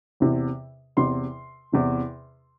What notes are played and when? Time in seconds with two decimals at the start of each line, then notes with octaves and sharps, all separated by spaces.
0.20 E2 C3 E3
0.97 E2 C3 E3 C6
1.72 E2 C3 E3